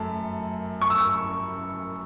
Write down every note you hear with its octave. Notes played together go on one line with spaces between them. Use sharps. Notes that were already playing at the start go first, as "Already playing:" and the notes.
Already playing: F#2 A3 A5
C#6
E6
C#6